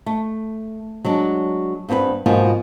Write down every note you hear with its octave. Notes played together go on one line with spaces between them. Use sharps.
A3
F#3 G#3 D4
G2 B3 C4 G4 B4
G#2 B2 F3 A#3 B3 F4